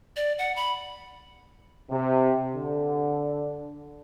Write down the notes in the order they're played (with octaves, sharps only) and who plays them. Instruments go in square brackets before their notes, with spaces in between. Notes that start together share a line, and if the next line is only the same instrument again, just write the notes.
[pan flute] D5
F#5
B5
[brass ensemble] C3
D3